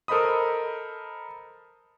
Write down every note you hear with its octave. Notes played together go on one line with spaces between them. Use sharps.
A4 A#4 C5 D#5 B5 D#6